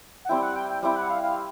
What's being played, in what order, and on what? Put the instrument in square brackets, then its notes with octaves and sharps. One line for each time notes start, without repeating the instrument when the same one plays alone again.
[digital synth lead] F#5
[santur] G3 C4 E4 [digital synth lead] G5
[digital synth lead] F#5
G5
G5
[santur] G3 C4 E4 [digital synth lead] G5
[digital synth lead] F#5
F5
F5